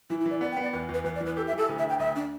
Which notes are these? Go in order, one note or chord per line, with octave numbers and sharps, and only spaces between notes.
E3 E4
E4
E3
D5
B3 D5
G5
B3
D5
E2 B4
E2
B4
E2 B4
D5
E3
B4
G4 A4
E5
E3
A4
D2
E5
D3 G5
D2 E5
D4